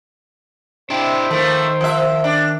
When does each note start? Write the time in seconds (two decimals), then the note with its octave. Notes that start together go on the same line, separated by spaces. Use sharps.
0.90 C3 D4 E4 C5
1.31 D#3 F3 A3 A#4
1.81 F3 E5
2.24 D4